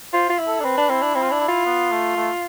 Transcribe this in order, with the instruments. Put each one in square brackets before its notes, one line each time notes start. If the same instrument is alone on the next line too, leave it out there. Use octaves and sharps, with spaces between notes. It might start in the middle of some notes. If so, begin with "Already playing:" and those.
[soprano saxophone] F4 [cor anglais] C5
[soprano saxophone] F4
E4
[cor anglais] A4
[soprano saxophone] D4
[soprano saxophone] C4 [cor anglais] B4
[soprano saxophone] D4
[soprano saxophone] C4 [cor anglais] E4
[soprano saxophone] D4
[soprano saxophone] C4 [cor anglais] E4
[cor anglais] F4
[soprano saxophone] D4 [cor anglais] E4
[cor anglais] E4
[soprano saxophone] F4
[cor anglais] B3
A3
A3